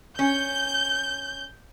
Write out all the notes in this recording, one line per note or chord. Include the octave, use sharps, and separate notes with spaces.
C#4 G6